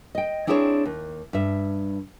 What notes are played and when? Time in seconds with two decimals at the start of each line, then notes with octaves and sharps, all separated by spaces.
0.15 D#5 G5
0.47 C4 D4 E4 G#4 A4 C#5
0.86 D#2
1.33 G2 E5